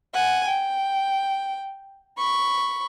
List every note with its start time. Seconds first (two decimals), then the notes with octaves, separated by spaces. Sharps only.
0.14 F#5 G#5
0.48 G5
2.18 B5 C#6